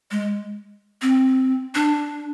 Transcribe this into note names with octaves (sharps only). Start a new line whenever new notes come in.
G#3
C4
D4